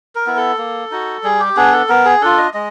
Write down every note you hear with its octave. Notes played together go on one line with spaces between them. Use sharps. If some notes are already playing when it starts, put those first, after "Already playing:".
A#4
B3 E4
A4
A#3
D#4 F#4
G3 G#4
G4
B3 D4 G#4
A4
B3 A#4
G#4
D4 F4 A4
D#5
G#3 D#5